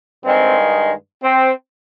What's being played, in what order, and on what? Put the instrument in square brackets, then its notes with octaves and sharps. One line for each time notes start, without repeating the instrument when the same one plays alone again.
[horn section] G2 D#3 G#3 C4
C4